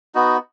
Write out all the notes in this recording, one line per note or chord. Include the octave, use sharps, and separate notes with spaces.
B3 D#4 F#4